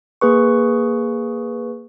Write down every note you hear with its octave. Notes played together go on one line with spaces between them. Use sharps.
A#3 G#4 B4 C#6